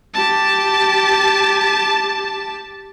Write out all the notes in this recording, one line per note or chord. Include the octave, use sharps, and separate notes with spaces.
G4 A5